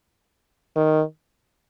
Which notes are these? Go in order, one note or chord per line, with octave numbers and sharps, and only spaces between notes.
D#3